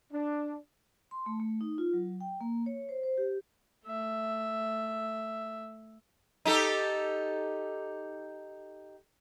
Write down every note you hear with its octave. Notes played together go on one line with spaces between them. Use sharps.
D4
C6
A3
A3
D#4
F4
F#3
G5
A#3
C#5
C5
C5
G4
A3 E5
D#4 G4 A4